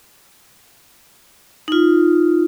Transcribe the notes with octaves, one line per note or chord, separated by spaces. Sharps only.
D#4 F4